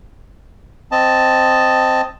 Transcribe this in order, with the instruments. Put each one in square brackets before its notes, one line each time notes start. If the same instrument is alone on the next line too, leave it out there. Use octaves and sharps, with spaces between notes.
[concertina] C4 D#5 A5